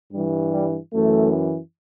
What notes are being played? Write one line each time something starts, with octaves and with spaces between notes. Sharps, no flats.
G2 E3 G3
G3
F#2 E3 A3